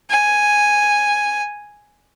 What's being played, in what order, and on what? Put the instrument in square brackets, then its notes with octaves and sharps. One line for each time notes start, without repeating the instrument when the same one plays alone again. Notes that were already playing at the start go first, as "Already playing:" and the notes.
[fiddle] G#5